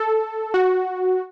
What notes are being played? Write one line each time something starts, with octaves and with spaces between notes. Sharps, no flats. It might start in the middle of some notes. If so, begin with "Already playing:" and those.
Already playing: A4
F#4